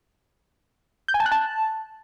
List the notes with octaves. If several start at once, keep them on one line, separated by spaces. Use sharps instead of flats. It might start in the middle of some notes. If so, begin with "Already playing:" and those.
G6
G#5
A5
F#6
A5